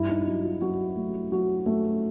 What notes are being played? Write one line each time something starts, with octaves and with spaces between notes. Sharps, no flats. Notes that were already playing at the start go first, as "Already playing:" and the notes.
Already playing: G2 E4
D#4
F#3
F4
F#3 F#4
A3
F#3 F#4
A3